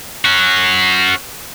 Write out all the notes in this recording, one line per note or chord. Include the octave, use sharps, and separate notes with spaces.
C#4 F#4